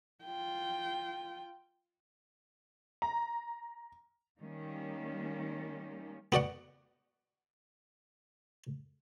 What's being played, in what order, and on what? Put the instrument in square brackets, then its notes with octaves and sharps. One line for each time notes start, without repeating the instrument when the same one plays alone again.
[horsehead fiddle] F4 G5
[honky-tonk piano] A#5
[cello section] D#3 G3 A#3 C#4
[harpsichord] B3 F#4 D5 F#5